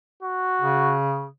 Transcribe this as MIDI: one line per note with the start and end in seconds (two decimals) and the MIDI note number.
0.23 0.95 66
0.62 1.28 49